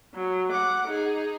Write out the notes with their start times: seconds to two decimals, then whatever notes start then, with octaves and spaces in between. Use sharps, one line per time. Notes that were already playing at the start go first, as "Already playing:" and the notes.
0.14 F#3
0.51 F#5 D6
0.88 D#4 G#4